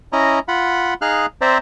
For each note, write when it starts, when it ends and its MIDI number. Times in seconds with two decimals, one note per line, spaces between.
0.13 0.39 61
0.13 0.39 64
0.13 0.39 75
0.13 0.39 82
0.48 0.94 65
0.48 0.94 78
0.48 0.94 83
1.02 1.26 63
1.02 1.26 68
1.02 1.26 77
1.02 1.26 89
1.02 1.26 90
1.41 1.58 60
1.41 1.58 72
1.41 1.58 74
1.41 1.58 76
1.41 1.58 82